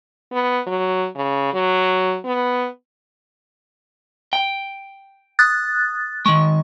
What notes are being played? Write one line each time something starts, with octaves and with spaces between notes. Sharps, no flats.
B3
F#3
C#3
F#3
B3
G5
D#6 F#6 A6
D#3 G#3 C#6